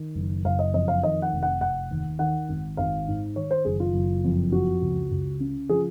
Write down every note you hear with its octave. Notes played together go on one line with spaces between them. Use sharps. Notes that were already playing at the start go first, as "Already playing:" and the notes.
Already playing: D#3
F#1
F#1 F5
D#5
F2 D#5
F5
D#3 D#5
F#5
F1
F#5
F1 F#5
D#2
D#3 F#5
G#1
G#1 F5
G#2
D#3 C#5
C5
F#1 G#4
F4
F#1
F2
F3 F#4
C#2
C#2
C#3
F3 G#4